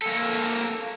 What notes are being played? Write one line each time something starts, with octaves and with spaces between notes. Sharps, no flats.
A#3 A4